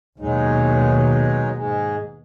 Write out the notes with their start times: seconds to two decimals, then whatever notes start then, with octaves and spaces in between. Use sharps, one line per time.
0.19 D#2 B2 F#3 G#3 D#4
1.55 G#2 G#3